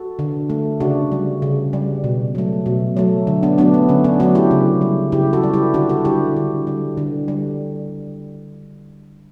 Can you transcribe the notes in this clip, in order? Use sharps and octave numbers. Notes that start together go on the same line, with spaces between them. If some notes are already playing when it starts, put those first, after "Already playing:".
Already playing: F#4 A4
D3
A3
C#3 D4 F#4
G3
C#3
G3
B2
F#3 A3
B2
F#3 A3
D3
B3 D4
F#3 A3 B3 D4
B3
D3 C#4
B3 D4
F#3 A3 D4 F#4
E4 G4
C#3
G3
C#3 E4 G4
F#4 A4
G3
E4 G4
D3 D4 F#4
F#4 A4
G3 E4 G4
D3
G3
D3
G3